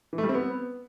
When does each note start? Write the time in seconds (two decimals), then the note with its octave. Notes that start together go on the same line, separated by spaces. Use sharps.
0.13 E3
0.18 A3
0.24 G3
0.29 C4
0.34 B3